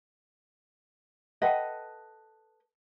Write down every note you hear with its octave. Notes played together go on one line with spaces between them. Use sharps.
A4 B4 D#5 E5 F#5 G5